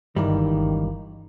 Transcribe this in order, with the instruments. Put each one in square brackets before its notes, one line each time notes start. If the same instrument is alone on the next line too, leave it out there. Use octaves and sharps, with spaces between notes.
[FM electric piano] G1 A#4 [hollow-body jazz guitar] C#2 E3 G3 [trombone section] D#3